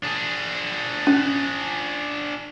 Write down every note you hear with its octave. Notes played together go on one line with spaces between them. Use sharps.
D4 G#4
C#4